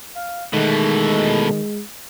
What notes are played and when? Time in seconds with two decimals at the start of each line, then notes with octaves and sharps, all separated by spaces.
0.15 F5
0.53 B2 D#3 E3 G#3 A3 D#4 A4